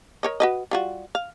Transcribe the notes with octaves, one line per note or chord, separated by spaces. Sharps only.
A#4 C#5 D#5
F#4 B4 D#5
G3 F4 F#4
F5